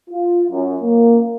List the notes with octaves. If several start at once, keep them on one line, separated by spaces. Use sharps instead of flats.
F4
F#2
A#3